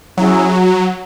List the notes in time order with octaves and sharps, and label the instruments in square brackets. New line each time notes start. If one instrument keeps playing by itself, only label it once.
[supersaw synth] F#3 [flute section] C#4 E4 G#4